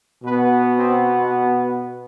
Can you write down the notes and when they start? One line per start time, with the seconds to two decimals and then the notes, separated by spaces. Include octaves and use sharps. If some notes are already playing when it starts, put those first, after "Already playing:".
0.23 B2 B3 B4
0.78 C4